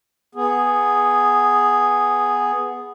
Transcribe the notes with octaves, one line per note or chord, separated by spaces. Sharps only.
B3 G#4